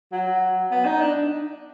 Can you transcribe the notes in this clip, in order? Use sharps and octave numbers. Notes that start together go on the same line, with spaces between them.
F#3
B3
D#4
D4